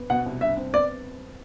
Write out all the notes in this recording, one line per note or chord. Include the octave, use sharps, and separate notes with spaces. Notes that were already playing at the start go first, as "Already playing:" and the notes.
Already playing: B3
B2 F#5
C2
G2 E5
C4
B3 D5